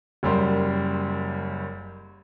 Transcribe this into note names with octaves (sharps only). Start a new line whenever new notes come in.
F#1 F#2 G3 A#4 C6